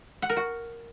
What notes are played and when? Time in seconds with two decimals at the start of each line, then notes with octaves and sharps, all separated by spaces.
0.22 F#5
0.30 A#4
0.37 F#4